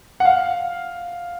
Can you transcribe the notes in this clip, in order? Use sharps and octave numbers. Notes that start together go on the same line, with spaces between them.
F#5
F5